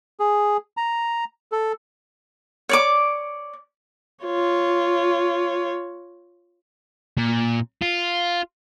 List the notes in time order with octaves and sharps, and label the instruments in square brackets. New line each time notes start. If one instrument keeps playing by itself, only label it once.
[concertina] G#4
A#5
A4
[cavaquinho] C#5 D5 D6
[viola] F4 C#5
[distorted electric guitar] A#2
F4